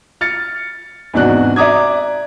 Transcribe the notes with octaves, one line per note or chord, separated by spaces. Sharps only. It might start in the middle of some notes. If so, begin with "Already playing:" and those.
F6 A6 C#7
E2 G#2 C3 D4 F#4 F#6
D5 E5 A#5 D6 D#6 G#6